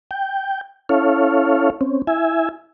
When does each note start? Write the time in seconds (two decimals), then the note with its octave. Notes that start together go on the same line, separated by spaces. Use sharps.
0.11 G5
0.89 C#4 E4 A4 C#5 F5
1.81 C4 C#4
2.07 E4 E5 G#5